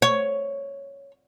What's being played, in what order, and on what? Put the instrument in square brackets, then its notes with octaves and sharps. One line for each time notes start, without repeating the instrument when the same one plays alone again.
[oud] C#5